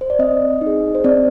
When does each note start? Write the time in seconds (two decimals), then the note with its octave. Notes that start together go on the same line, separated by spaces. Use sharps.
0.01 C5
0.10 D5
0.19 C4 D#5
0.61 D#4
0.67 G#4
0.95 C5
1.04 C4 D5